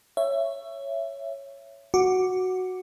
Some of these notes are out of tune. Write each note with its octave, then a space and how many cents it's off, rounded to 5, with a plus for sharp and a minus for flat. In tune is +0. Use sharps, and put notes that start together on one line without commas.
C#5 +0 E5 +20
F#4 +0 D6 +0